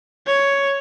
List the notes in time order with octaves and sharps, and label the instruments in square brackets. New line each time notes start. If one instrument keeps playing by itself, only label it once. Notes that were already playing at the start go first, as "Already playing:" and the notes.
[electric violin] C#5